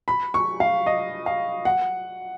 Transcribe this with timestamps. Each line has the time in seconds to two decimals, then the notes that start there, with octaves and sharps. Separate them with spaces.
0.08 B5
0.34 C#6
0.60 F5
0.86 D#5
1.26 F5
1.65 F#5